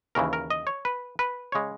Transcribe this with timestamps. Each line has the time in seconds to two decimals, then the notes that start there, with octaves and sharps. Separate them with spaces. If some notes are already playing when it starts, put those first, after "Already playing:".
0.15 D#2 C#3 E3 A#4
0.33 A#4
0.50 D#5
0.67 C#5
0.85 B4
1.19 B4
1.52 C#3 G#3 C#5